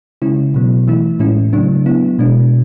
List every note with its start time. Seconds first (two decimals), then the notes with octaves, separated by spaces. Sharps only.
0.22 C#3 G#3 C#4 E4
0.54 B2 F#3 B3
0.88 E3 A3 E4
1.19 A2 G#3 C#4 E4
1.53 C#3 F#3 A3 D4
1.86 F#3 B3 E4
2.19 B2 G#3 D4